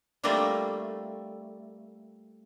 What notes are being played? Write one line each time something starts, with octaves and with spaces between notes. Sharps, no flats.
G3 A3 A#3 C4 D4 F4